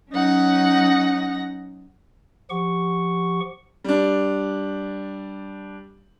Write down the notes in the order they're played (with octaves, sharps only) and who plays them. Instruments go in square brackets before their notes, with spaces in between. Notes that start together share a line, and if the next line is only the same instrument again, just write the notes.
[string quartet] F#3 C#4 D#4 F#5 A#6
[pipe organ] F3 G4 F#5 C#6
[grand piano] G3 D4